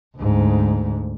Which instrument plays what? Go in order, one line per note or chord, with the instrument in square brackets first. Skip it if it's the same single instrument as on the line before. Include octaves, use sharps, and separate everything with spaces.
[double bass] D2 G#2